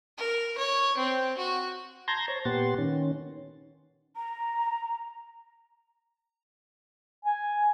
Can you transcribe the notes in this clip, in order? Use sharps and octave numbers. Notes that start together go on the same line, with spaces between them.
A#4
C#5
C4
F#4
A5 A#5 C6 G6 G#6 A#6
C5 C#5 A5
A#2 B3 G4 F#5 C6 A6
D#3 C#4
A#5
G#5